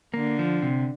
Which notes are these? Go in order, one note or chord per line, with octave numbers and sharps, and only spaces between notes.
D3 A#3
F3
C3